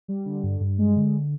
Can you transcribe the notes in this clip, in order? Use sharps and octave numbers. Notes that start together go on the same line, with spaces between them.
G3
D3
G2
G2
G#3
D3